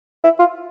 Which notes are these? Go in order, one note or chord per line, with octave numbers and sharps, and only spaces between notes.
E4
F4